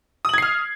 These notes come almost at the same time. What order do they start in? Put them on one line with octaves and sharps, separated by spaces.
D#6 F#7 G#6 C7 F6